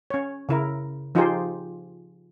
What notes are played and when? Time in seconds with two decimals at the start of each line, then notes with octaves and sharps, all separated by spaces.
0.10 C#4 C#5
0.49 C#3 E4 A#4
1.15 F3 D#4 F4 G4 G#4 C5